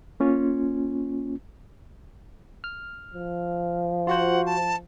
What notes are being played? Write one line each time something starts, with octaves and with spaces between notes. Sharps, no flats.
A#3 C#4 F4
F6
F3
F4 F#4 C5 F#5
A5